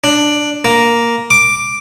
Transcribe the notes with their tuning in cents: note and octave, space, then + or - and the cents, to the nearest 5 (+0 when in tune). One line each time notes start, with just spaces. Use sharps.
D4 +5
A#3 +5
D6 +5